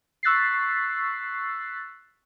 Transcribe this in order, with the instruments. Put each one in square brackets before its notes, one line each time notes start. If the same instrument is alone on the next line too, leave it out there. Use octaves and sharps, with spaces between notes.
[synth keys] C#6 E6 F#6 A6 B6 C7